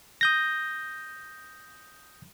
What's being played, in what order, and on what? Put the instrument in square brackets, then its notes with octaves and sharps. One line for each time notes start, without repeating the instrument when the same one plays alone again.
[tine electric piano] D#6 G6 A#6